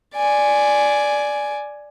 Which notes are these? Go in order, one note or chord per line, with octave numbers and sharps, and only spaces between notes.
D5 G#5